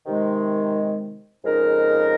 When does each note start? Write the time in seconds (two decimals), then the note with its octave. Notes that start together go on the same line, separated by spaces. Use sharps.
0.05 C3 D#3 G#3
1.43 F2 C#3 G#3 D#4 A#4